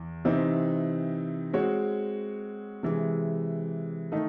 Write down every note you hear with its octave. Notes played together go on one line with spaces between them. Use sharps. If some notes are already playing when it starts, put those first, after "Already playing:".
Already playing: E2
C3 E3 C4 D#4
G#3 C4 F#4 C#5
C3 E3 G#3
D#3 A3 D#4